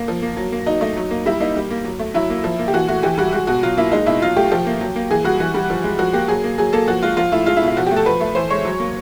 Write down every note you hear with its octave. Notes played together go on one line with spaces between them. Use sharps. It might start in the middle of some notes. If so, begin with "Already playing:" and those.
Already playing: A#3
F3
A#3
F#3
A#3
F#3 D#4
A3 D#4
F#3
A#3
G3 E4
A#3 D#4
G3
A#3
F#3
A3
F#3 E4
A#3
F3
A#3
G4
E3 F#4
A3 F#4
E3 G4
G3 F#4
G#3 F#4
B2 F#4
F#3 F4
A#3 E4
G#3 D#4
B2 E4
F#3 F4
A3 G4
F3 G4
A#3
F#3
A#3
E3 G#4
G3 F#4
E3
G3
F3
G#3
F3 F#4
A#3 G4
F#3 G#4
A#3
F#3 G#4
A#3 A4
F3 F#4
G#3 F4
F3 F4
A3 E4
G#3 F4
E4
B2
E4
F3 F#4
G4
A3
A4
F3 B4
A3
E3 C5
G#3 C#5
F#3
A#3